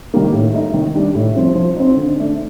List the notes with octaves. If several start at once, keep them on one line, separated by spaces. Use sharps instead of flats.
D#3 G3 A#3
A2
A3 D#4
D#3
G3 D4
A2
F3 C4
F3
C4 D#4
D3
A3 D4